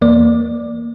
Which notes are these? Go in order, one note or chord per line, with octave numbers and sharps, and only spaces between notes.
E2 A#3 D5